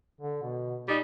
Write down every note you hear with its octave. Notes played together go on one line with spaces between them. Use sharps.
D3
B2
A#2 G3 D#4